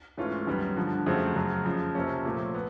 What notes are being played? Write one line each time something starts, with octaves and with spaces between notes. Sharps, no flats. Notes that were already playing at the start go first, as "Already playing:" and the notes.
G#2 E3 A3 C#4 F4
F#2 D#3 G3 B3
G2 D3 F3
F2 C#3 F#3 A3 C4
F#2 C#3 F#3
F2 C#3 F3
F2 C3 F3 A#3 C#4
A#2 F3 A3 C4
B3